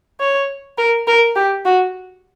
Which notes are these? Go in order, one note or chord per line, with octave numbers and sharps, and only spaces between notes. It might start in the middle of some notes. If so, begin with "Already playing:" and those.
C#5
A#4
A#4
G4
F#4